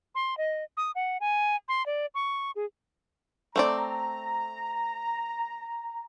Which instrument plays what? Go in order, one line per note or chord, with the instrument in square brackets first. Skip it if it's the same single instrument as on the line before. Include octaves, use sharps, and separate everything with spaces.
[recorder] C6
D#5
D#6
F#5
G#5
C6
D5
C#6
G#4
[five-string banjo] A3 C4 D5 [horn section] A#5